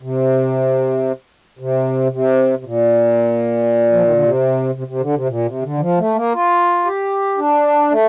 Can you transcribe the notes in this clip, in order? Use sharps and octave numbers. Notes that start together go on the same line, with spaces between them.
C3
C3
C3
C3
A#2
F3
D#3
D3
C3
C3
C3
D3
C3
A#2
C3
D3
D#3
F3
A3
A#3
F4
G4
D4
A3